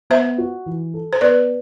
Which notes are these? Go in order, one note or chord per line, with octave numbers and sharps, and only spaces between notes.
B3 C5 E5
F#4
E3
A4
C5
B3 B4 D5